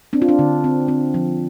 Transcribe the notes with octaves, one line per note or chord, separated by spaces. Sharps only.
C4 D4
F4
D4
D3
C4
C4
F3